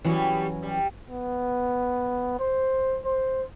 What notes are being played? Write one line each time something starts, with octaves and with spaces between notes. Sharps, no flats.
B2 E3 F#3 G3 C#4
G3
B3
C5
C5